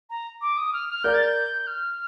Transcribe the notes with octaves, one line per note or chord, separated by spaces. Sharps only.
A#5
D6
D#6
F6
F6
A#4 D5 G6
A6
G6
G6
F6